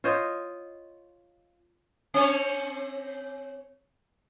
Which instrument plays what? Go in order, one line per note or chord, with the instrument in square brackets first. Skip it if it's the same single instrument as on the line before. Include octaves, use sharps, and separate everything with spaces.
[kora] F4 C5 C#5 D#5
[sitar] C4 C#5